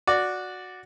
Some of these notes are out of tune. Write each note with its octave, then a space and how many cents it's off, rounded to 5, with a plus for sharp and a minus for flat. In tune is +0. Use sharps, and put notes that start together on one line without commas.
F#4 -10 D5 +0